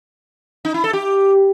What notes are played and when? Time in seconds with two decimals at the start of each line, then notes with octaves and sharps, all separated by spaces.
0.65 D#4
0.74 E4
0.84 A4
0.93 G4